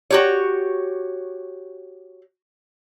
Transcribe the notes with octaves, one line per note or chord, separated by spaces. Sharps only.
F#4 G4 C#5